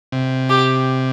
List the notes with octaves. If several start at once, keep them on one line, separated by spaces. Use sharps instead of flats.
C3
G4